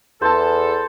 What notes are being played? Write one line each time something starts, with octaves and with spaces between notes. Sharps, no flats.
E2 A4 C5 A5